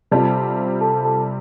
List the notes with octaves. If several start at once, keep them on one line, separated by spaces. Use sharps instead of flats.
C3 G3 C4 F4 A4 A5
A4 A5
A4 A5